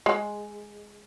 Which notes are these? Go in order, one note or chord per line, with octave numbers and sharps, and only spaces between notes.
G#3